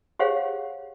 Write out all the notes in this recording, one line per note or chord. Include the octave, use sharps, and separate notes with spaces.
G4 G#4 C5 C#5 F5 F#5